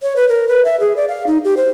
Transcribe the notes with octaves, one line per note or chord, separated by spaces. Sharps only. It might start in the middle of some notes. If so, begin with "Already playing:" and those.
C#5
B4
A#4
B4
E5
G#4
D5
F5
D#4
G4
C5